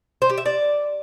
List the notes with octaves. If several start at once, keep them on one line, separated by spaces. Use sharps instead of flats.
C5
G4
E5
D5